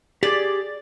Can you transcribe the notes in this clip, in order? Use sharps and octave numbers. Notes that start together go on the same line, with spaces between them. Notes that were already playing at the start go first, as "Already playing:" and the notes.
G4 G#4 D5